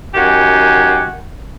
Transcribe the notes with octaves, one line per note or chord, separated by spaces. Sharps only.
F#2 D#3 F#4 G4 G#5